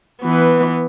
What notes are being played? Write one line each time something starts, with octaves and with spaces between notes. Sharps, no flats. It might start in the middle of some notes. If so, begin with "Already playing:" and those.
E3 B3